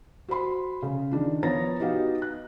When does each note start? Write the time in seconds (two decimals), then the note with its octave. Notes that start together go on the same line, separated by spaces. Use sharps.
0.29 F#4 C5 B5 C6
0.82 C#3
1.11 D#3 D4 F4
1.43 F3 B3 C#5 A#5 A6 A#6
1.80 B3 D#4 F#4 G4 F5
2.22 F#6